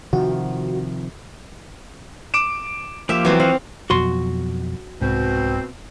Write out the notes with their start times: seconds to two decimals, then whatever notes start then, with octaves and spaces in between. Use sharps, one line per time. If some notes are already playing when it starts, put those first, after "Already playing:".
0.13 C3 D#3 F3 F#4
2.34 D6 D7 E7
3.09 F3 A#3 G4 E5
3.25 E3 F#3 C4
3.40 E3 F3 C4 F#4 F5
3.90 F2 B2 F#3 F#4 C6
5.01 C2 G#2 B2 C4